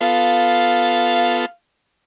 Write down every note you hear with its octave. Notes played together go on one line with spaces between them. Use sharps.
B3 F4 A4 F5